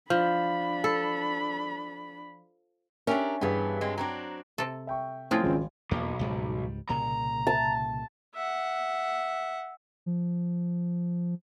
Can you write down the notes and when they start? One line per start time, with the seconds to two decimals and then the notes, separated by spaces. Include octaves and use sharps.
0.10 F3 D4 B5
0.84 A4
3.07 C#4 D4 G4 A#4 E5
3.41 G2 E3 G3 B3 G#4 B4
3.81 G#3 C4
3.98 F#3 C4 D4 A#5
4.58 C3 A4
4.87 E5 G5 C#6
5.31 A2 F3 G#3 C4 C#4 F4 G5
5.43 G#1 C#2
5.91 B1 E2 A3 A#3
6.19 C#2 G#2 G3
6.89 C2 A#2 C#3 A#5
7.47 A5
8.34 E5 F#5
10.06 F3